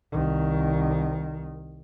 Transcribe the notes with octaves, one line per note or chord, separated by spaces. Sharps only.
C2 D#3